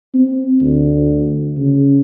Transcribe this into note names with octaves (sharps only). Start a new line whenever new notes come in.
C4
D2
C#3